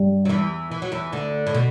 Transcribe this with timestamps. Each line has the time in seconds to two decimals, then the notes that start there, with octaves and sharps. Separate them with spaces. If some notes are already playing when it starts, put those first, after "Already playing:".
Already playing: G2 G3
0.25 F#3
0.29 E2 E3
0.71 E3
0.82 F#3
0.92 E2 E3
1.12 D2 D3
1.47 A2
1.54 B2